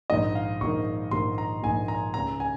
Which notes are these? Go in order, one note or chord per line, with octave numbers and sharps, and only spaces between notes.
A#1 G#2 D#3 D#5
F5
A#1 G#2 D#3 C#6
A#1 G#2 D#3 C6
A#5
A#1 G#2 D#3 G#5
A#5
C#2 C#3 A#5
G#5